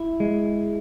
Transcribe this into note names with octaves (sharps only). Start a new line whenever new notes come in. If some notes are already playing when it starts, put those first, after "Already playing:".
Already playing: E4
G#3